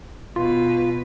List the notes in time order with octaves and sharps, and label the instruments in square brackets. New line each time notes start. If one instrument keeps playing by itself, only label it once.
[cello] B2 B4 [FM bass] F4